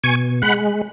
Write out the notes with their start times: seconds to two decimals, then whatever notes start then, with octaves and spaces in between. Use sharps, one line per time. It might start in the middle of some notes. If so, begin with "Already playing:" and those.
0.04 B2 G#5 C#6
0.42 G#3 F#5 B5